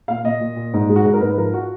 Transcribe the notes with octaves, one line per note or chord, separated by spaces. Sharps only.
A#2 F5
A#2 D#5
A#2
A#2
G#2
G#3
F#4
G#2 G#4
A#4
G#2 B4
F3 A#4
F#4